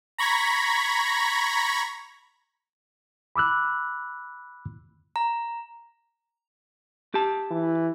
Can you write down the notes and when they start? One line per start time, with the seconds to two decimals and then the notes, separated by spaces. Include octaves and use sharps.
0.18 A#5 B5 C#6 G#6 A#6 B6
3.36 B5 D6 E6 F#6
5.16 A#5
7.14 G4 A5
7.51 E3